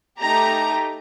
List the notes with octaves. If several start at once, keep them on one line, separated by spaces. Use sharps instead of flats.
A3 D#4 G4 A#5